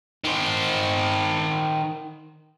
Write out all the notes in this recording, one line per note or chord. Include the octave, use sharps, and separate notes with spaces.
D#3 C5